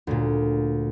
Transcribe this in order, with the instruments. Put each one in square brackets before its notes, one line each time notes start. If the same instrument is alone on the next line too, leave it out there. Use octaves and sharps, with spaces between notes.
[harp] D2 A#2